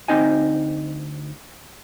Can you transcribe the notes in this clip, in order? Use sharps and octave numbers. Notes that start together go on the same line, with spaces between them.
D2 C4 D#4 D#5 G#5